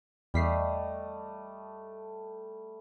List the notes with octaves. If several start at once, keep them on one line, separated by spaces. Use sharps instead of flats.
E2 G3 A3 D#5 B6 C7